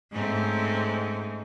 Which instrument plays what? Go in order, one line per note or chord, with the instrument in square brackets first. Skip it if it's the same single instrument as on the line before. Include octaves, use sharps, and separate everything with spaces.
[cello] G#2 [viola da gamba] A3 C4 C#4